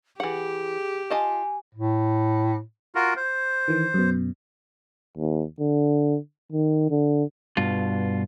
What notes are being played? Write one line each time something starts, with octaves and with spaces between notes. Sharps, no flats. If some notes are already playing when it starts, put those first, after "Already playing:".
E3 G4 G#4 F#5
F4 D#5 G#5 A5
A2
F4 F#4 A#4
C5
D#3 E3
F#2 B2
D#2
D3
D#3
D3
G2 B2 F4